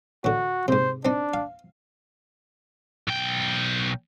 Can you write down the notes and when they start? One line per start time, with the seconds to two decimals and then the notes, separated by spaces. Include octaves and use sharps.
0.24 A2 D3 F#4
0.68 G#2 C3 C5
1.05 C4 D4 D#4
1.34 F5
3.08 B1 G5